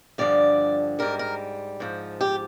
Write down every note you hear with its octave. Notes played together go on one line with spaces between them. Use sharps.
G2 D3 F3 D5
G#2 G3 A#4
A#4
G#2 F3
G4